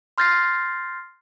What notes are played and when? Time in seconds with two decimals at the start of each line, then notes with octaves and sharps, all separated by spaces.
0.18 C6 F6 G6 A6 A#6 C7